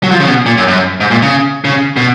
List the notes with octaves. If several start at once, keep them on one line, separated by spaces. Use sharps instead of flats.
F#3
F3
C#3
B2
A#2
F#2
F#2
G#2
A#2
C#3
C#3
B2